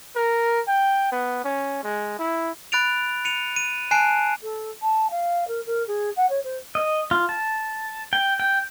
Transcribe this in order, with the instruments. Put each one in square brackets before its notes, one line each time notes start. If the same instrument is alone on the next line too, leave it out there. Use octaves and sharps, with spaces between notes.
[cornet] A#4
G5
B3
C#4
G#3
E4
[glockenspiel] B5 F#6 A6 D7 F7
C#7 D#7 F7
D#7
G#5 A5 F#6 C7 D7 E7
[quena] A4
A5
F5
A#4
A#4
G#4
F#5
C#5
C5
[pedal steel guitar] D#5
F4
A5
G5
G5